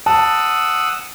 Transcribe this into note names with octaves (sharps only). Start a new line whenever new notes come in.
F#5 A5 D#6 E6